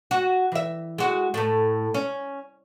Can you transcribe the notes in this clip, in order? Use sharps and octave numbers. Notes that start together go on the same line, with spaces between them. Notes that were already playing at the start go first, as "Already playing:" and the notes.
F#4
E3 E5
G#3 F#4
A2 A3
C#4